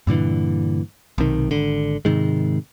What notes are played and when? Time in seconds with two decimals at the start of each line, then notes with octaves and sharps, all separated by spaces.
0.07 G2 A#2 D3 E3
1.18 B1 C3 D#3
1.51 G#1 D3
2.05 G#2 C3 D#3 G#3